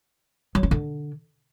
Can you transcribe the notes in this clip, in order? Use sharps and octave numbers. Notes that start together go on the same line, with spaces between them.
F#3
C#4
D3